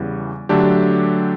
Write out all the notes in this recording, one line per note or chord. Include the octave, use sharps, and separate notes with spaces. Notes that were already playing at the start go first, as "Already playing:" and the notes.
Already playing: E2 C#3 E3 G3
D3 F#3 A3 D4 G4